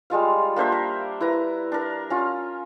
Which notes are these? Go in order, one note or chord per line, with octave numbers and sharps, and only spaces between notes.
G3 G#3 F4 F5
A#3 D4 C5 E5
A#4
E4 B4 A#5
D4 A#4
C#4 F4